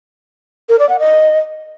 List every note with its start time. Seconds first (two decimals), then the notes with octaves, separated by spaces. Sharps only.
0.69 A#4
0.79 D5
0.89 F#5
0.99 D#5